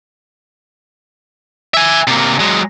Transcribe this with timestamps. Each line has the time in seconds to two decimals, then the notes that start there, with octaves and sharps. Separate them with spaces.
1.74 E5 G#5
2.08 C3 A#3
2.40 F#3 G#3